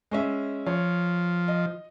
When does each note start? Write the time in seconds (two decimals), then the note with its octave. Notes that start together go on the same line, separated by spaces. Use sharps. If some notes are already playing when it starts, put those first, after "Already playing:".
0.11 G#3 C#4 E5
0.66 F3 C#5
1.48 D#5